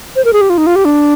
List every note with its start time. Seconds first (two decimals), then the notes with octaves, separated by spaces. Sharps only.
0.16 C5
0.25 A#4
0.33 G#4
0.41 G4
0.50 F4
0.58 D#4
0.67 F4
0.76 G4
0.85 D4